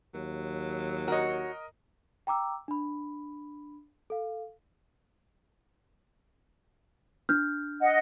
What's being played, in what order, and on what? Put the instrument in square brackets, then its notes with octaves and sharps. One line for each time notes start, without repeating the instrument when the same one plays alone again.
[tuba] D#2 [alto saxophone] F#3
[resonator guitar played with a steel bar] F#4 C#5 [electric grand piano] A#4 D#5
[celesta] G5 A#5 D6 E6
D4 B5
A4 F5
D4 F6 G6
[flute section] D#5 F#5